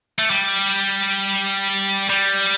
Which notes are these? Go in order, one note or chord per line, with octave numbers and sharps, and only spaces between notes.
A3
G3
G3